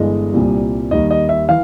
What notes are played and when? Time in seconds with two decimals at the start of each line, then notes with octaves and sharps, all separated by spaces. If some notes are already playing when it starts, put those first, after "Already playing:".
Already playing: G1 G2 E3 G#3 D#5
0.34 C2 A#2 G3
0.91 D#2 D#3 G3 D#5
1.11 D#5
1.29 E5
1.49 E3 F5